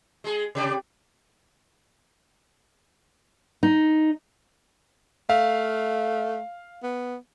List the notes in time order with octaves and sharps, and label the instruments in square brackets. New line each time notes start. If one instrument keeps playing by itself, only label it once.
[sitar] G#3 G#4
C3 G4 D5
[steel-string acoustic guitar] D#4
[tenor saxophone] A3 [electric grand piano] F5
[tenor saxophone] B3